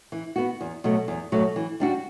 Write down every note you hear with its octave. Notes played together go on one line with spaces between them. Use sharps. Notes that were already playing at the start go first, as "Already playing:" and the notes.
E3
B3 F#4
E2
B2 F#3 A3
E2
B2 F#3 A3
E3
G3 D4 F#4